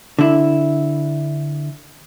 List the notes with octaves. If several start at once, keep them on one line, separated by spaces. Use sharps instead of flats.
D3 E4